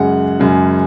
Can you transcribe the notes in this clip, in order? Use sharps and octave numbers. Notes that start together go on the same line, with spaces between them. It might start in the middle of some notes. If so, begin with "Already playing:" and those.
Already playing: F#2 C#3 G#3 F#5
F#2 C#3 G#3